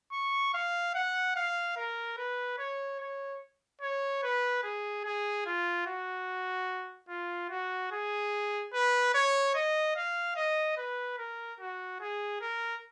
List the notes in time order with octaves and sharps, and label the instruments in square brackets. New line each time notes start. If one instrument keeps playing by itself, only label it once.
[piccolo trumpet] C#6
F5
F#5
F5
A#4
B4
C#5
C#5
C#5
B4
G#4
G#4
F4
F#4
F4
F#4
G#4
B4
C#5
D#5
F5
D#5
B4
A#4
F#4
G#4
A#4